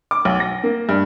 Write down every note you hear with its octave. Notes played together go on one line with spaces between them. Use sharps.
D6
B1
A#6
A#3
G2